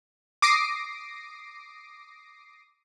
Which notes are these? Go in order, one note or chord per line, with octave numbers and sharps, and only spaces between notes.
D6 D#6 A#6 C7 D7